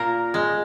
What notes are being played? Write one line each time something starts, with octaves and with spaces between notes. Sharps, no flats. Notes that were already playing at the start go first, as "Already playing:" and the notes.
Already playing: A#2 A#4
G#3